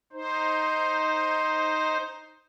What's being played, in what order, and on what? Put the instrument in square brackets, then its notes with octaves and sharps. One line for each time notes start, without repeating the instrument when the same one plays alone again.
[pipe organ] D#4 C5